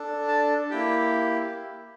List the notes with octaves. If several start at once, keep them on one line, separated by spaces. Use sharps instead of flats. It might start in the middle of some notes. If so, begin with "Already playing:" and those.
Already playing: D4 A4
A5
A#3 E4 G4 G5